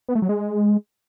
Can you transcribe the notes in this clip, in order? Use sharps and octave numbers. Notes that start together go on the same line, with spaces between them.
B3
A3
F#3
G#3